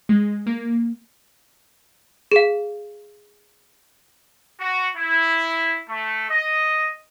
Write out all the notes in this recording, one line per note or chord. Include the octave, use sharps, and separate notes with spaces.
G#3
A#3
G#4 F5
F#4
E4
A3
D#5